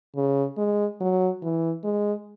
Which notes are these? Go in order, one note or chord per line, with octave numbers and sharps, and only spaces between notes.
C#3
G#3
F#3
E3
G#3